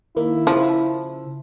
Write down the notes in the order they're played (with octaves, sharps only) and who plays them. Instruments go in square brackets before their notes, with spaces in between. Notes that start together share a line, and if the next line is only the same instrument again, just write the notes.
[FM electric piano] D#3 A#3 [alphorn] E4
[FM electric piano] C#3 [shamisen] F3